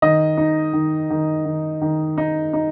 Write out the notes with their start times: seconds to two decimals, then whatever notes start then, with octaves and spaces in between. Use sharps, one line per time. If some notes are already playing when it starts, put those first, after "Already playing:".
0.02 D#3 D#5
0.37 D#4
0.73 D#3
1.10 D#3
1.45 D#3
1.81 D#3
2.18 D#4
2.53 D#4